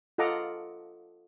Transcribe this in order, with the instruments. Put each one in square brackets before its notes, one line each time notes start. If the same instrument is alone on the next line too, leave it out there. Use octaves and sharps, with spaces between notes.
[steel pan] F4 A4 D#5 F#5 A#5 D6